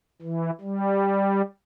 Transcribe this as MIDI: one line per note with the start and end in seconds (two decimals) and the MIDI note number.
0.22 0.50 52
0.61 1.42 55